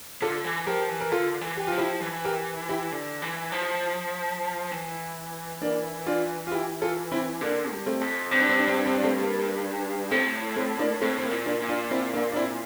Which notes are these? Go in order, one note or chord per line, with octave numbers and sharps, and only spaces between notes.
D3 F4 A4
E3
F3 G4 A#4
E3
A#4
D3 F4 A4
E3
G4
F3 F4
E4 G4
E3
G4 A#4
E4 G4
D3
E3
F3
E3
A#3 D4
D4 F4
F4
E4 G4
F4 A4
C4 E4
D3 A#3 D4
G2
A3 C4
F2
G2 C4
D4
C4
D4
C4
D4
C4
D4
A3 C4
A#3
A2 A3 C4
A3 C4
A#3 D4
A2 A3 C4
C4
A#3
A#2
A#3 D4
A#2
D4 F4
C4 E4
A#3 D4
D4
C4 E4